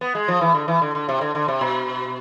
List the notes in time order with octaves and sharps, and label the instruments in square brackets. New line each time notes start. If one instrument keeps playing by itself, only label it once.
[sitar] B3
G#3
F3
E3
D3
E3
D3
D3
C3
D3
D3
C3
B2